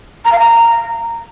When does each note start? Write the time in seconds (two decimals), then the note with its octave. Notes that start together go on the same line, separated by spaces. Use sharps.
0.25 A#5
0.32 F5
0.39 A#5